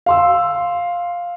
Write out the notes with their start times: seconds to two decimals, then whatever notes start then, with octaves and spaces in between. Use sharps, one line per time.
0.06 F5 C6 E6